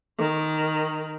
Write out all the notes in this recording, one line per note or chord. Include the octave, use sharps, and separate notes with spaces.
D#3